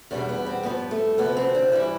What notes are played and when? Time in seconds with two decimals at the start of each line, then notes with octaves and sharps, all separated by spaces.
0.11 E2 B2 G3 D4
0.29 B3
0.46 C4
0.64 G2 F3 B3
0.91 A3
1.18 D2 C3 F3 B3
1.37 C4
1.55 D4
1.72 G2 E3 G3 E4